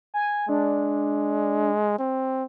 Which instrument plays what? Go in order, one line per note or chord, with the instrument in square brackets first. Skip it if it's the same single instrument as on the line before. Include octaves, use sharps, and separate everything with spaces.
[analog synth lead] G#5
[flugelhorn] G#3 [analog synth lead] D4
[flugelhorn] C4